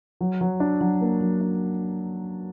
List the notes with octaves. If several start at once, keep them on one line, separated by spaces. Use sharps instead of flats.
F#3
F#3
D4
F#3
A#3
F#3
D4